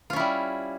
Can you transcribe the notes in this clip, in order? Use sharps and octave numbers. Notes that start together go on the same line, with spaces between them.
G3 C#4 E4 F4